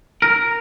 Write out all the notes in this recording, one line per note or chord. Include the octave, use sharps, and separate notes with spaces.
A#4